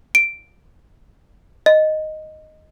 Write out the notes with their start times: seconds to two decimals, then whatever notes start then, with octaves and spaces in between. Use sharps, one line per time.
0.15 D7
1.66 D#5